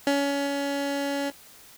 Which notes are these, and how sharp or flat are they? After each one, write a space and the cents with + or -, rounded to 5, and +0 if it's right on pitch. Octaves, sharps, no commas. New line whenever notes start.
C#4 +25